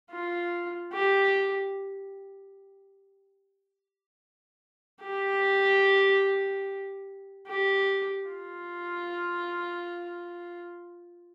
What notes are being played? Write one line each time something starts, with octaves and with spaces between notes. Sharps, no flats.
F4
G4
G4
G4
F4